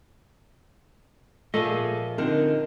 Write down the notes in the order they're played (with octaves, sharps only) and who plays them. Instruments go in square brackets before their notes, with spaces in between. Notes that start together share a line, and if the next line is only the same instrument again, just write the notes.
[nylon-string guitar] A#2 F3 [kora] A3 [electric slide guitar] G#4 D#5
[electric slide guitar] D3 C4 [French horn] D#4 [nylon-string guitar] A#4